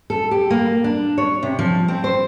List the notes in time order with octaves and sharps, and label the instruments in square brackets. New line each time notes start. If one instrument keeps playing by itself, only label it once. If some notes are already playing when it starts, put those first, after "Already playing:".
[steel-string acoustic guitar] A4
G4
A#3
D4
C#5
C3
F3
C4
C5